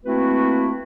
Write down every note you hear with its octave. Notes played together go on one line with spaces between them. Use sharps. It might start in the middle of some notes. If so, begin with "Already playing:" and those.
A3 A#3 C4 E4 F#4 B4